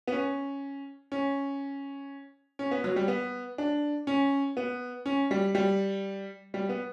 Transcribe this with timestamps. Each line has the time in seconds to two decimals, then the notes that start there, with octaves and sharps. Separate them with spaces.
0.07 B3
0.12 C#4
1.12 C#4
2.59 C#4
2.71 B3
2.84 F#3
2.96 G3
3.08 B3
3.58 D4
4.07 C#4
4.57 B3
5.06 C#4
5.31 G3
5.55 G3
6.54 G3
6.69 B3